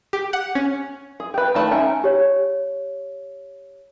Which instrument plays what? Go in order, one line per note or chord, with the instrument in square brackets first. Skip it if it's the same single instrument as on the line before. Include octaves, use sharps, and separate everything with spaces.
[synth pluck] G4
F#5
C#4
[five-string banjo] G#4
G4 B4
D#3 A3 A5 B5
C#4 D#4 E5 G5
[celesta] G4 C#5